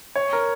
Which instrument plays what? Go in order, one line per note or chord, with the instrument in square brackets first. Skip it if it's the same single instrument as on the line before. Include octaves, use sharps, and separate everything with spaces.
[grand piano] C#5
A#4